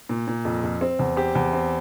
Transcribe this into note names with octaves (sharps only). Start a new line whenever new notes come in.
A#2
A#2
F2
F2
C4
E2
C4 G4
E2
C4